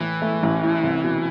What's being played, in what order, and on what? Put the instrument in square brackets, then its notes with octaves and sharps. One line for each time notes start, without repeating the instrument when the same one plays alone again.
[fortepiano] A2 [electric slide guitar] E3
[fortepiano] A3
A1
A2
C2
B2